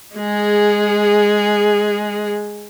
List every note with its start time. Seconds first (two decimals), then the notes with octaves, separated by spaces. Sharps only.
0.16 G#3 G#4